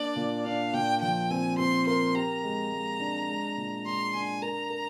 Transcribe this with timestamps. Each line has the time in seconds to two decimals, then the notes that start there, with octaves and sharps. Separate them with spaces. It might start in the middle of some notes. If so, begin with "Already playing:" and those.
Already playing: A#3 D4 D5
0.16 A#2
0.45 D4 F5
0.73 A#2 G5
1.01 F3 G5
1.30 C4 G#5
1.58 C4 C6
1.87 A#4 C6
2.15 G4 A#5
2.43 G#3
2.71 G#3
3.00 D4
3.28 G#3
3.57 A#2
3.86 G#3 C6
4.14 D4 G#5
4.42 A#4 A#5
4.70 A#4